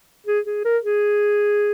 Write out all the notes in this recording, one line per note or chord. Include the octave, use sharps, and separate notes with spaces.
G#4
G#4
A#4
G#4